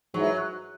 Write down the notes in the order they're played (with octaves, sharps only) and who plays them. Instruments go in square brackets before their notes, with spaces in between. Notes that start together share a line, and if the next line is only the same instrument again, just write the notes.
[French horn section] G#2 E3 G#3 E4 [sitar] F#3